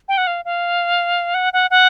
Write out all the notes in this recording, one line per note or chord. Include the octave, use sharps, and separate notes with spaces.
G5
F#5
F5
F5
F#5
F#5
F#5